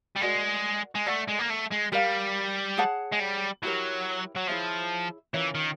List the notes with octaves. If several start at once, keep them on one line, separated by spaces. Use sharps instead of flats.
G3
G#3 F#4 A#4 D5 F#5
G#3
A3 A4 D5 F#5
G#3
A#3
A3
G#3
G3 G4 A#4 D5 F5
G#4 C#5 F#5 A5
G#3
G3
F#3 E4 G4 A#4 C#5
F#3
F3 E4 G#4 C#5 E5
E3 C#4 F4 A#4 C#5
D#3